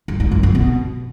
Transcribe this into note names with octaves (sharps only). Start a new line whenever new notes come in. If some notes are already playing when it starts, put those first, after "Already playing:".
G2
G#2
F#2
G2
B2